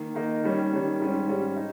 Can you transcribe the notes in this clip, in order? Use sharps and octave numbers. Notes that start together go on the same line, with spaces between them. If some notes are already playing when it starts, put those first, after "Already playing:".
Already playing: D#3 A#3
D#3 A#3 D#4
D#3 G3 C#4
D#3 G3 C#4
G#2 G3 C#4
G#2 G3 C#4
D#4